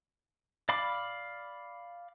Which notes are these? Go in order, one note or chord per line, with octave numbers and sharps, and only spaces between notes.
D5 F5 B5 D6